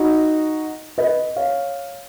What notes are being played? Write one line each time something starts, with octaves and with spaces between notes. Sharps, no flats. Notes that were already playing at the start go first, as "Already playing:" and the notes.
Already playing: D#4 F#4
B4 D#5
C#5 F5